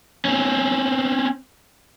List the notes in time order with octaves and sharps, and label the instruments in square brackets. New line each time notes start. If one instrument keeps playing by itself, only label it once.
[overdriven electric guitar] C4 C#4